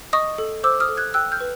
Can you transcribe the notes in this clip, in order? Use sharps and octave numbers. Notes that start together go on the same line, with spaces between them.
D#5 C#6 D#6
A4
C5 D6 E6
D#6 F6
A4
F#6 G#6
G5 E6 F#6
F6 G6
B4